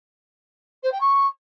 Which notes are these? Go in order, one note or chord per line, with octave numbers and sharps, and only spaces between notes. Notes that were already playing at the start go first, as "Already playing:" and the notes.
C5
G5
C#6